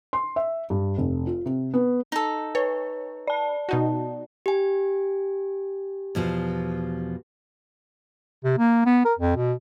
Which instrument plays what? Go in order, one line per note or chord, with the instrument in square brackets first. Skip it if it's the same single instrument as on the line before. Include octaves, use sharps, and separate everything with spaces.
[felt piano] C6
E5
G2
F1
F4
C3
B3
[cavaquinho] D#4 A4
[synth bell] B4 [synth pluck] C#5
[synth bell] D5 A5
[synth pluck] B2 D#4 F#4
[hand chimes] G4 G#5
[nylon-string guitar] E2 B2 F3
[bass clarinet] C3
A#3
B3
A#4
F2
B2